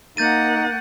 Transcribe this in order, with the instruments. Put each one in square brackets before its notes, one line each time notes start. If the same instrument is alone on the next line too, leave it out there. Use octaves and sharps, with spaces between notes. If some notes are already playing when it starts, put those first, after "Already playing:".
[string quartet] A#3 F#5 [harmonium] D#4 [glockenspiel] G6 A6 D#7